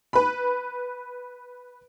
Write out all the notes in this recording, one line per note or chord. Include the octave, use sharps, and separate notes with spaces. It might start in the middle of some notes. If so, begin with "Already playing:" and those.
B4 B5